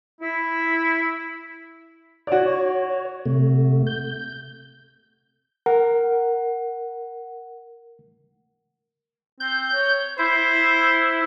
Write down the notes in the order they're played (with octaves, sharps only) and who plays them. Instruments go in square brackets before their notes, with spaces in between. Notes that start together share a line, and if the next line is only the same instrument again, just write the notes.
[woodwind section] E4
[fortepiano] F#4 D5 [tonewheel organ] C#5
[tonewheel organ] C3 A3
G6
[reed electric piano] A#4 [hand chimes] F#5
[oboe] C4 [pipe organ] G6
[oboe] C#5
[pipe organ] E4 [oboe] C5